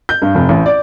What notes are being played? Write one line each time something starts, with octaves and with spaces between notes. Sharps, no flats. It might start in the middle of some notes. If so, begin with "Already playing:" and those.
G6
G2
F1
A1
D5